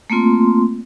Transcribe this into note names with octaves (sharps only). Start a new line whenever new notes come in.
A3 A#3 C4 F4 C6